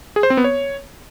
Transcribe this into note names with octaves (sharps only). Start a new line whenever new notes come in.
G#4
C5
C4
B3
C#5